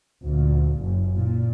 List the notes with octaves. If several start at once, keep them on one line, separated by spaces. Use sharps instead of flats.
D2 A#2
F#1
A#2